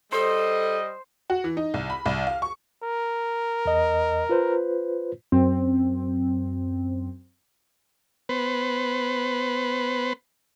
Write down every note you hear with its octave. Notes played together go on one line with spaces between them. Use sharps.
G3 A4 C5 D#5
F#4
E3
D#4
C2
B5
C2
F5
C#6
A#4
E2 D#5
F4 B4 C5
F#2 C4
B3 B4 C5